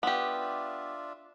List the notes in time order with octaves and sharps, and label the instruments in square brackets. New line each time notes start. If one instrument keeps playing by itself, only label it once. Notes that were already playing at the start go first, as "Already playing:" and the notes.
[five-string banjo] B3 G4 [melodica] D4 F4 E5